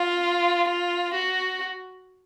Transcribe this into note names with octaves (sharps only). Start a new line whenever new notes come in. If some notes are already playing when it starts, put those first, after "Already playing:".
Already playing: F4
F4
F#4